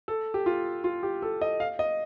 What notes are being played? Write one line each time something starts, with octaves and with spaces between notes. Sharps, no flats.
A4
G4
F4
F4
G4
A4
D#5
F5
D#5